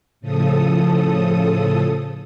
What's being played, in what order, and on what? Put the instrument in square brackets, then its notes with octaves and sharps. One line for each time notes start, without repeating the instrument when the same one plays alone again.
[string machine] A2 C#3 F3 A4 D#6